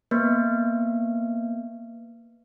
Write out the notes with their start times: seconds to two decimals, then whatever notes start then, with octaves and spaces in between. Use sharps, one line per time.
0.11 A#3 B3